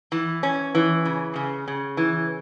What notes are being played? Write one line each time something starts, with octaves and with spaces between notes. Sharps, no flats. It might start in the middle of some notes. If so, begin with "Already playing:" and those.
E3
C#4
E3
C#3
C#3
C#3
E3